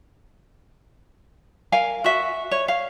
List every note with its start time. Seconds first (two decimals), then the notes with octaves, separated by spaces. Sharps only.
1.72 A#4 F5 G#5
2.04 F#4 E5
2.51 C#5
2.68 F5